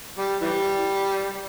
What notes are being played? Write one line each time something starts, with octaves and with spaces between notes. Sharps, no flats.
G3
E3 G3